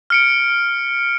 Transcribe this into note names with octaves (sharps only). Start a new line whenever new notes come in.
F6 C#7 D7